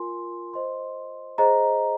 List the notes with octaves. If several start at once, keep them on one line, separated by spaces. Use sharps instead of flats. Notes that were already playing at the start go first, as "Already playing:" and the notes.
Already playing: F4 A#4 G#5 C6
C5 D#5 C6
G#4 C5 D#5 A#5